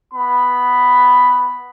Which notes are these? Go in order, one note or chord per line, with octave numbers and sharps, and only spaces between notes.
B3 B5